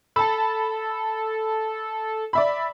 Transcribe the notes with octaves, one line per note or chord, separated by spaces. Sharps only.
A4 A5 B5
D5 E5 B5